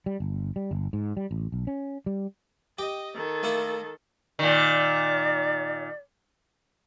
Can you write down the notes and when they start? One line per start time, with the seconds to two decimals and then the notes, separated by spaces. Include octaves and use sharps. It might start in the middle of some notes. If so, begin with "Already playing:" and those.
0.06 G3
0.20 G1
0.56 G3
0.71 G1
0.93 G#2
1.17 G3
1.31 A1
1.52 B1
1.67 C#4
2.06 G3
2.78 G4 D#5 G5
3.15 D#3 A4
3.43 A3 A#3 E4
4.39 A#2 D#3 D5